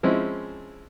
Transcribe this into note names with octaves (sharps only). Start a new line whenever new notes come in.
F3 G#3 C4 C#4 E4